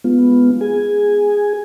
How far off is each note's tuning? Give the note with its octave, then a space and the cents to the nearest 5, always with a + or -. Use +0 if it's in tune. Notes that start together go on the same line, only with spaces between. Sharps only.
G#3 +0 B3 +0 F4 +0
G#4 -10 G#5 +0